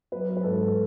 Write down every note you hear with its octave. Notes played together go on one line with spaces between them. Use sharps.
F#3 B4
B4
G#2 A4